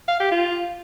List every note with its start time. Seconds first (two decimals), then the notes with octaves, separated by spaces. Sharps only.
0.08 F5
0.20 G4
0.32 F4